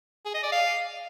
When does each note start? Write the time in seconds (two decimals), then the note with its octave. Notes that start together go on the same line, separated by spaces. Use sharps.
0.25 G#4
0.34 D#5
0.43 D5
0.52 F5